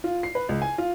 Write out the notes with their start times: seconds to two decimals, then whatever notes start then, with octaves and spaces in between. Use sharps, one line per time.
0.04 F4
0.23 C7
0.35 B4
0.49 C#2
0.62 G#5
0.78 F4